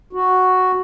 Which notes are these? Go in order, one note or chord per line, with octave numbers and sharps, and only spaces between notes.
F#4